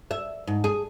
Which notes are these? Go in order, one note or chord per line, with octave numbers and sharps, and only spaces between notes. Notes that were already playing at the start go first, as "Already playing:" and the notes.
E5
G#2
G#4